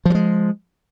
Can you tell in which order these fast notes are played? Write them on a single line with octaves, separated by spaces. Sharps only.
F3 F#3 G#3